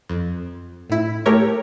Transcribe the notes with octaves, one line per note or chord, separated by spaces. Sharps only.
F2
A2 E4
A3 G4 A#4 C#5